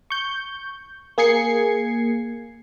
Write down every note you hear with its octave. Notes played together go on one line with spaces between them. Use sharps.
C#6 G6
A#3 G#4 G#6 C7 C#7